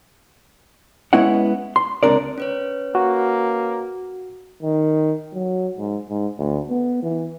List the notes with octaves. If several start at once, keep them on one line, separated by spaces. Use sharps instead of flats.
G#3 B3 C#4 E4 D#5 F#5
C6
C#2 F#2 C4 D4 A#4 D5
C#4 B4 C#5
A#3 F#4
D#3
F#3
G#2
G#2
D2
B3
E3